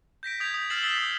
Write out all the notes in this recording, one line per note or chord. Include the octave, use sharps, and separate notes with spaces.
G6 A#6 B6 D7
D#6 G6 G#6 B6 F7
D#6
E6 F6 A6 C7 E7 F#7
E6 A6 B6 C7 E7 G7
D#6 G6 B6